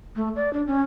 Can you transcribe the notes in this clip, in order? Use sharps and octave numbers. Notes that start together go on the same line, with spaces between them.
A3
D5
D4
C#4